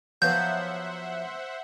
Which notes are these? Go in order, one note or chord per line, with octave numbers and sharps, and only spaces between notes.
F3 F#3 B3 C5 E5 F#5 G6